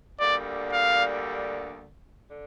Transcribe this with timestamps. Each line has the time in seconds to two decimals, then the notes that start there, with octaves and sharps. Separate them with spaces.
0.20 D2 D3 G3 A#3 D5
0.72 F5
2.31 D3